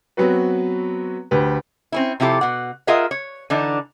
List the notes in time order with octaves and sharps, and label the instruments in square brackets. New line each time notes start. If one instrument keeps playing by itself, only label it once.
[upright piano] F#3 B3 C4 F#4 B4
D2 G4 B4
[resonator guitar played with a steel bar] C4 C#4 E4
C3 F3 E4 G4 A4
B2 F#5
F4 G#4 A#4 D#5 E5 F#5
C#5
D3 E3 D4 D#4